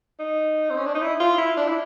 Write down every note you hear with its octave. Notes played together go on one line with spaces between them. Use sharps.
D#4
C4
C#4
D4
D#4
E4
F4
E4
D4
E4